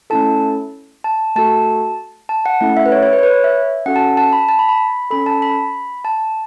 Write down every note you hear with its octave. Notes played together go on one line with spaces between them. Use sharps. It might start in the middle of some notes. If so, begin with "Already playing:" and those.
A3 C#4 E4 A4 A5
A5
A3 F#4 A4 A5
A5
F#5
A3 C#4 E4 A4 F#5
E5
B4
C#5
C#5
B4
C#5
B4
C#5
E5
C#4 F#4 A4 F#5
A5
A5
B5
A5
B5
B5
C#4 A4 B5
A5
B5
A5